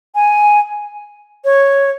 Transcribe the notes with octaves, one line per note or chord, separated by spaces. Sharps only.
G#5
C#5